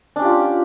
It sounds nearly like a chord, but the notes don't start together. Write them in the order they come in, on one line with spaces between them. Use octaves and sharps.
D4 C#4 G4 F4